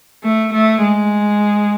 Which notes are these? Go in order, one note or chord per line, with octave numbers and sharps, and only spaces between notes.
A3
A3
G#3